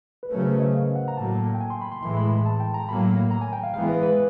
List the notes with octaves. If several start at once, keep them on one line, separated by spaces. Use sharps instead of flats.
B4
C#3 F#3 A3 C#4 A#4
C5
B4
D#5
F5
F#5
A#5
A2 F#3 A#3 A5
G5
G#5
C6
B5
C6
A2 E3 G#3 C6
B5
A5
G5
A#5
A2 F#3 A#3 B5
A#5
G#5
G5
F5
E3 G#3 B3 F5
B4
B4